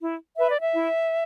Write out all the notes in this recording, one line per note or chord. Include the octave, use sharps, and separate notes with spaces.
E4
B4 E5
D5
E5
E4